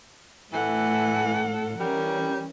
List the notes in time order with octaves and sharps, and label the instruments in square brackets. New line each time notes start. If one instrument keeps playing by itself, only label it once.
[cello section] A2 [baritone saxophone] E3 [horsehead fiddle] A4 F#5
[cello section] E3 C#4 [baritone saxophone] G3 [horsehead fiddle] A#4